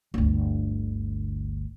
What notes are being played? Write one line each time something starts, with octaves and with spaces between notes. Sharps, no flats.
G1 D2